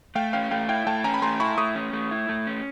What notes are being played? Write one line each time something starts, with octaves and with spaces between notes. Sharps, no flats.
A3 F5 G5
C#4 F5 G5
A3 F5 G5
E4 F5 G5
A3 G5 A5
C#4 G#5 A#5
B5
A3 A#5 C6
E4 B5 C#6
A3 C#6 D#6
C#4
A3
E4
A3
C#4